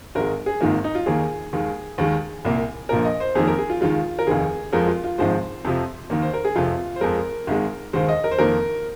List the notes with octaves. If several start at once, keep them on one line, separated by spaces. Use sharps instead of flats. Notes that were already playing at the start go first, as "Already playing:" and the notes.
G#1 G#2 G#3 A#4
G#4
G#1 G#2 D#3 A#3 F4
D#4
F4
D#2 D#3 A#3 G#4
D#2 D#3 G#3
D#2 D#3 G#3
C2 A#2 A#3
A#1 A#2 F3 A#3 A#4
D#5
C5
F2 D#3 A#3 G#4
A#4
G#4
F4
D#2 D#3 G#3 F4
A#4
F1 D#2 D#3 G#4
F2 F3 G#3 A#4
F4
F4
G#1 G#2 F3 G#3 C5
F2 C3 F3
D#2 D#3 A#3
C5
A#4
G#4
F1 F2 C3 F4
C5
F2 F3 G#3 A#4
G#1 G#2 G#3
D#2 D#3 G#3 C5
D#5
A#4
C5
F2 D#3 A#3 A#4